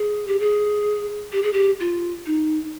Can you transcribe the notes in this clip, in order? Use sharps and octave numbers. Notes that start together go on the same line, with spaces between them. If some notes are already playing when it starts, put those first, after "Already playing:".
Already playing: G#4
G4
G#4
G4
G#4
G4
F4
D#4